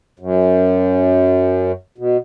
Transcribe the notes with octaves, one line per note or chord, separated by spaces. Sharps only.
F#2
B2